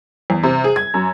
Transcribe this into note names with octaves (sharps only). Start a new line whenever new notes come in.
E2
C3
G#4
G#6
F#2